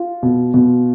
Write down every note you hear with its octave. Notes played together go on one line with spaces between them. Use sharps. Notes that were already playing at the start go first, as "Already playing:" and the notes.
Already playing: F4
B2
B2